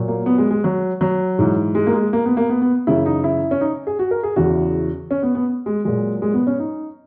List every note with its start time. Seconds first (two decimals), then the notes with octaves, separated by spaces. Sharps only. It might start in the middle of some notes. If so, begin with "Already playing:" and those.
Already playing: A#2 F#3
0.08 A#3
0.26 B3
0.38 G#3
0.51 G#3
0.64 F#3
1.01 F#3
1.39 G#2 E3
1.75 G#3
1.87 A#3
1.93 G#3
2.13 A#3
2.25 B3
2.37 A#3
2.49 B3
2.61 B3
2.87 F#2 C#3 E3 E4
3.06 D#4
3.24 E4
3.51 C#4
3.61 D#4
3.87 G#4
3.99 F#4
4.11 A#4
4.23 G#4
4.36 E2 C#3 E3 F#4
5.11 C#4
5.23 B3
5.35 B3
5.66 G#3
5.85 A#2 F#3 G#3
6.22 G#3
6.34 B3
6.47 C#4
6.59 D#4